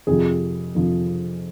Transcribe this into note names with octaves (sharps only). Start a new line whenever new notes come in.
F2 C3 F3 G#4
F2 C3 F3